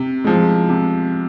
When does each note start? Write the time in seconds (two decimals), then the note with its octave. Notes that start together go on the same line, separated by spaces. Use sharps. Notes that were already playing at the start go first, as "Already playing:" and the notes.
Already playing: C3
0.24 F3 G#3
0.69 C3